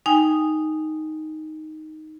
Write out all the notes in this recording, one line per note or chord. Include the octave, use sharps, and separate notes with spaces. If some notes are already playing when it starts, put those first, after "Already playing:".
D#4 G5 G#5